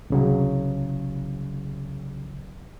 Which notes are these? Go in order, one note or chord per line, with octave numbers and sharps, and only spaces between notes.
C2 C#3 F#3